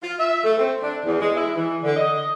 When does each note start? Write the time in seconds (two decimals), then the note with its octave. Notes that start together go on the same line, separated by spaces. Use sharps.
0.02 F4
0.19 E5
0.43 A3
0.58 C4
0.82 D4
1.05 E2
1.21 G#3
1.35 E4
1.56 E3
1.83 D3
1.96 D#5